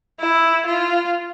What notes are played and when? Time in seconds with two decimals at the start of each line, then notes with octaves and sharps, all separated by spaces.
0.20 E4
0.66 F4